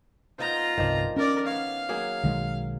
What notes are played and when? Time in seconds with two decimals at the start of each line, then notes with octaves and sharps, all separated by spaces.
0.39 B3 D#4 F4 C5 A#5
0.77 G1 C2 D#3 F3 D4
1.16 C#4 A#4 D5
1.46 B3 C#5 F5
1.89 F#3 A#3 G#4
2.23 B1 D#3 G#3